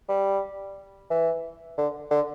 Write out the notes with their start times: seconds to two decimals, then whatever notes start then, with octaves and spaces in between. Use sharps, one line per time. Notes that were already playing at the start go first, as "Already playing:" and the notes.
0.09 G3
1.10 E3
1.78 D3
2.11 D3